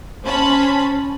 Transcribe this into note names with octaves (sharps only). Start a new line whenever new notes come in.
C#4 C5 A5 B5